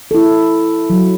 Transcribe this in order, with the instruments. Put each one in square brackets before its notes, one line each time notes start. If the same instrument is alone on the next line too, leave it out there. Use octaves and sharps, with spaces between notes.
[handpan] E4 A4
F#3